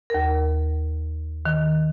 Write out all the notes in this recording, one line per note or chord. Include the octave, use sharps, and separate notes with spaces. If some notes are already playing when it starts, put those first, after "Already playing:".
D#2 A#4
D#3